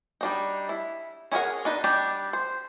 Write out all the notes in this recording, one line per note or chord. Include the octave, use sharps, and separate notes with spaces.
G3 D4 D#4
E4
C#4 E4 G#4 A#4 F#5
D4 D#4 B4
G3 D4 G4 D5
C5